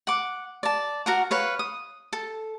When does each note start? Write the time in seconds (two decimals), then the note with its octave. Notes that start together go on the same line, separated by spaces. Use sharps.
0.07 F#5 D6
0.63 D5 A5
1.06 F#4 A#4 F#5
1.31 B4 C#5 F5
1.59 D#6
2.13 A4